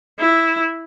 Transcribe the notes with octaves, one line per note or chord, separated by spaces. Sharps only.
E4